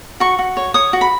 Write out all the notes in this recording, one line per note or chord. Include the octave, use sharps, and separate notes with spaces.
F#4 C#6
F#4
C#5
C#5 D#6
F#4
B5